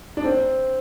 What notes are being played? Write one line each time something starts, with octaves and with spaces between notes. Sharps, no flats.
D4
C4